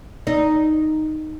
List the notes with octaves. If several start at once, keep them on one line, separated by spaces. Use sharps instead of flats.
D#4